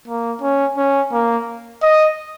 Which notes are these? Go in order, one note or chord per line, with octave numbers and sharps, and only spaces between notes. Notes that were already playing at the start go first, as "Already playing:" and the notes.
A#3
C#4
C#4
A#3
D#5